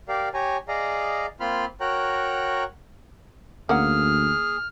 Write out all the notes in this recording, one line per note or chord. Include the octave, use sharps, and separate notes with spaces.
G4 A#4 D5 F5
G4 C#5 G#5 A#5
G#4 D5 D#5 F5 A#5
A#3 C4 F4 B5 C6 F6
F#4 A#4 C#5 G5 A#5 F#6
D2 A#3 C#4 G#4 F#5 F6